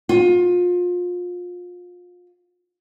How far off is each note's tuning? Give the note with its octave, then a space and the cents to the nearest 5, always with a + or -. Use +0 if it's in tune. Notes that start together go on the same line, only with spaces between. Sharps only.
F4 +30